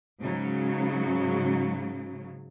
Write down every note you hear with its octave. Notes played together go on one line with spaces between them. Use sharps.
G#2 C#3 F#3